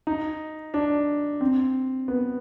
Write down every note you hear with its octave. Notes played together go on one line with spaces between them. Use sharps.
D#4
D4
C4
B3